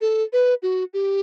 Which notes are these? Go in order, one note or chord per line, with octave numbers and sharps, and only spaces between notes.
A4
B4
F#4
G4